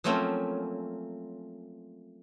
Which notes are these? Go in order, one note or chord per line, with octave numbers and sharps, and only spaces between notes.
F3 F#3 A3 A#3 C4 C#4